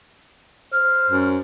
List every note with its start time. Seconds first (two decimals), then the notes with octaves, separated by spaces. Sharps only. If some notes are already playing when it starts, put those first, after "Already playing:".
0.72 C5 F6
1.10 F#2